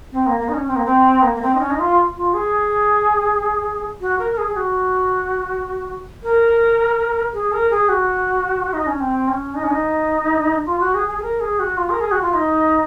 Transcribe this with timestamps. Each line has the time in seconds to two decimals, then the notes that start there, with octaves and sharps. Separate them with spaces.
0.12 C4
0.26 A#3
0.40 A#3
0.49 D#4
0.53 C#4
0.67 C4
0.76 A#3
0.85 C4
1.22 A#3
1.35 A#3
1.42 C4
1.55 D#4
1.59 C#4
1.70 D#4
1.79 F4
2.16 F4
2.33 G#4
4.01 F#4
4.19 A#4
4.33 A#4
4.37 G#4
4.48 G#4
4.56 F#4
6.23 A#4
7.33 G#4
7.52 A#4
7.71 G#4
7.89 F#4
8.73 D#4
8.87 C#4
9.00 C4
9.28 C#4
9.55 D#4
9.63 C#4
9.70 D#4
10.66 F4
10.80 F#4
10.94 G#4
11.08 G#4
11.18 G#4
11.22 A#4
11.40 G#4
11.59 F#4
11.77 F4
11.90 A#4
12.00 G#4
12.11 F#4
12.22 F4
12.34 D#4